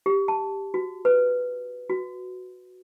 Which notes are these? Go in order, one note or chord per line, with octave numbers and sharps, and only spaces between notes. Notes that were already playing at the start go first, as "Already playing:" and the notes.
G4
A5
F#4
B4
F#4